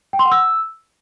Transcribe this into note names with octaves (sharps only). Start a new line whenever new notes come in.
G5
C6
F#5
E6